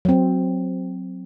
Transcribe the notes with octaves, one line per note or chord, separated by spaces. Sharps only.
F#3 C4